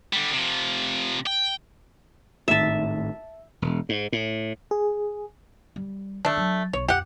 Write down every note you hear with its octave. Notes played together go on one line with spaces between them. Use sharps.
D3 G3
C3 F3
G5
G#1 A2 D#3 E5 A5
E1
G#2
A2
G#4
G3
D#3 A3 D4
F#3
B1 C#5
F2 G4 F#5